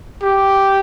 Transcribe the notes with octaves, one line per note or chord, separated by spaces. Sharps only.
G4